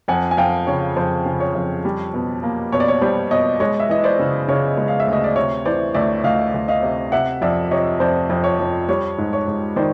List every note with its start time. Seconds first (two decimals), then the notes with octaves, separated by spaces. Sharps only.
0.08 F2 F#5 G#5
0.31 G#5
0.37 F2 F5 G5
0.67 C#3 C#5
0.96 F2 C5
1.26 C#3
1.40 C#5
1.55 F2
1.85 G3
2.14 B2
2.43 A#3
2.72 B2 C#5
2.80 D5
2.88 C#5
3.01 G3 C5 D5
3.31 B2 C#5 D#5
3.60 G#3 C#5 D#5
3.80 E5
3.89 E3 D#5
4.04 C5 D5
4.19 C#3
4.48 C#3 C#5
4.77 G#3
4.88 F5
5.00 E5
5.07 D2
5.13 D#5
5.24 D5
5.36 C3 C#5
5.66 E3 C5 D5
5.94 D2 D5 E5
6.24 D2 D#5 F5
6.54 D2
6.68 D#5 F5
6.83 C3
7.12 C3 E5 F#5
7.41 F2 D5 E5
7.71 C3 C#5 D#5
8.00 F2 C5 D5
8.29 F2
8.44 C#5
8.59 F2
8.88 G3 C#5
9.18 G#2
9.33 C#5
9.48 G#2
9.76 D#3 C5 D5